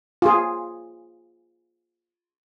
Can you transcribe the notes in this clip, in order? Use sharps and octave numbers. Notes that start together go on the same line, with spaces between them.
F4 G#4